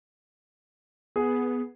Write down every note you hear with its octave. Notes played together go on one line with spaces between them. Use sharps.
B3 G#4